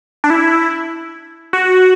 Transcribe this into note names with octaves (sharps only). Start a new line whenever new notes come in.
D4
E4
F#4